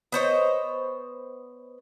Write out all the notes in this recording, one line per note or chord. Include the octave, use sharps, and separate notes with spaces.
B3 C5 C#5 D#5